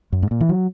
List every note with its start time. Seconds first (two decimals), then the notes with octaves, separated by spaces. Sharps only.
0.12 F#2
0.22 G#2
0.31 A#2
0.41 E3
0.49 F#3